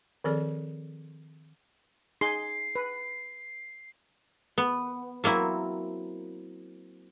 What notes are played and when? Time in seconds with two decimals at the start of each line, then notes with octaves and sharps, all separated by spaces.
0.24 D#3 F3 C4 G#4 A4 D5
2.21 D#4 G#4 C6 C7
2.76 B4
4.58 B3
5.24 F#3 A#3 C4 E4